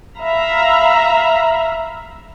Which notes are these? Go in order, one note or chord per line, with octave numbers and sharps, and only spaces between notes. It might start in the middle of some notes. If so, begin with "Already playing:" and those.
E5 F5 A#5 B5